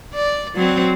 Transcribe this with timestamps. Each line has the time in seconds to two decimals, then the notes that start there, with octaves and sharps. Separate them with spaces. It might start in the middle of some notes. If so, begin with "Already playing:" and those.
0.14 D5
0.56 F#3 C4